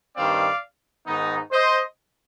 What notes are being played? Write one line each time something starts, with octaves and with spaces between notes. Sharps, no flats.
G2 D#3 G3 C4 D5 F5
G#2 D#3 B3 D#4
C5 D#5